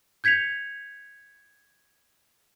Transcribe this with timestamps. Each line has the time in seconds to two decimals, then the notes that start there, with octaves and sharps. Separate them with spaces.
0.24 G6 G#6 B6 C#7 F7